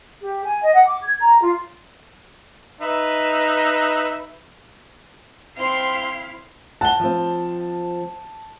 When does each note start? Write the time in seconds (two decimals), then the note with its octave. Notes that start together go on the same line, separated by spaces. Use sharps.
0.21 G4
0.45 G#5
0.62 D#5
0.73 F#5
0.86 D6
1.03 G#6
1.20 A#5
1.41 F4
2.81 D#4 B4 E5
5.57 C4 E4 F5 C6
6.81 F#5 A5 G7
7.00 F3 C4